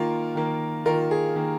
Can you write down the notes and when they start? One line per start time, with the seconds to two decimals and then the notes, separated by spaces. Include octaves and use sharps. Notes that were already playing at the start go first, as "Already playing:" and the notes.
Already playing: D#3 A#3 F4 A#4
0.35 D#3 A#3
0.85 D#3 A#3 F4 A#4
1.11 G#4
1.35 D#3 A#3